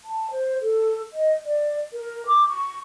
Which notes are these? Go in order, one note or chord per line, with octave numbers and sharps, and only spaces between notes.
A5
C5
A4
D#5
D5
A#4
D6
C#6